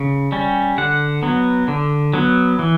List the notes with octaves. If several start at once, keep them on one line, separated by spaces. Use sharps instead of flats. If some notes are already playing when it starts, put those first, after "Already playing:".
Already playing: C#3
G3 C#4
D3 F#5
F#3 B3
D3
F#3 B3
E3